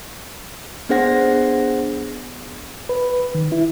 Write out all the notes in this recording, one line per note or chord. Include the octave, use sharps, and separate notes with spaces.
B3 D4 G#4 C5 F#5 A#6
B4
D#3
E4